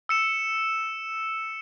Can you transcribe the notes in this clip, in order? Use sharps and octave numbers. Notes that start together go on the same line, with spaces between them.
E6 C#7 E7